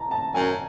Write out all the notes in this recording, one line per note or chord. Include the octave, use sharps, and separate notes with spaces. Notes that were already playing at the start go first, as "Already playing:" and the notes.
Already playing: A5 A#5
A5
F#2 G#5